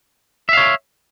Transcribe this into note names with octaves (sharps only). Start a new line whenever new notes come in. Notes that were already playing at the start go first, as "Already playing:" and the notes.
C#5 E5 F5